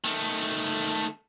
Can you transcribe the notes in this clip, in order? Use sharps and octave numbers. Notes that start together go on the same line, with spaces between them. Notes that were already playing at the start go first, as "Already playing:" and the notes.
D#3 A3